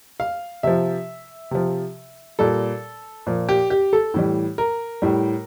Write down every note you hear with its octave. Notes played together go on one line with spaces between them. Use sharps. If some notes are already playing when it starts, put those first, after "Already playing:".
F5
C3 F3 E5
C3 F3
A#2 G3 A4
A#2 F3
G4
G4
A4
A2 E3 G3
A#4
A2 G3